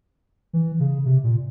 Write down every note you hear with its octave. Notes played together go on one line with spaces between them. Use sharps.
E3
C#3
C3
A#2